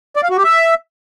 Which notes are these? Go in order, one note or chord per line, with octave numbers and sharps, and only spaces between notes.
D5
F5
F#4
G4
E5